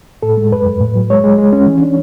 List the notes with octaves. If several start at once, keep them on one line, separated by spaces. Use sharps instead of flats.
A2 A4
G#3
F#2 B4
F#2
A2
F#3
G#3 C#5
G#3
G#3
C#4
E3
D4